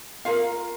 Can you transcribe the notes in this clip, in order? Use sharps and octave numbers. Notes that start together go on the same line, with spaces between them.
F4 A#4 F5